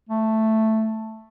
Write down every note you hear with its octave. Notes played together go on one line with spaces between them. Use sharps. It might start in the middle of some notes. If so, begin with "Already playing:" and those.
A3